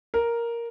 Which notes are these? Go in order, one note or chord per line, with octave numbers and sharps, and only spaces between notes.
A#4